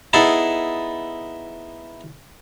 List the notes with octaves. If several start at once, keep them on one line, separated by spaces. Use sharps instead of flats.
B3 D#4 E4 G#4 A4 A5